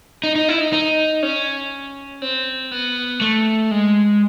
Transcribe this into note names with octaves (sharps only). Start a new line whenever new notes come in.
D#4
D#4
E4
D#4
D#4
C#4
C4
B3
A3
G#3